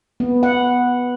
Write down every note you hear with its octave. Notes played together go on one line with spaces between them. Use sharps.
B3
F#5